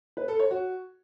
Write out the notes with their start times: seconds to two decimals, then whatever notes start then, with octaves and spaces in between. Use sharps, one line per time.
0.17 B4
0.28 A4
0.39 C#5
0.51 F#4